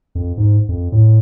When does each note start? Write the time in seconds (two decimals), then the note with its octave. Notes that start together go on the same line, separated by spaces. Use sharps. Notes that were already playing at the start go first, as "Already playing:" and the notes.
0.15 F2
0.37 G#2
0.69 F2
0.92 A2